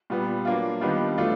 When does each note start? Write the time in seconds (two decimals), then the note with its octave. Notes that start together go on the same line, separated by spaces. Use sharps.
0.10 A#2 G3 B3
0.45 F#3 A#3 D4 F4
0.81 D#3 G3 B3 D4 F4
1.18 F#3 A3 D4 F4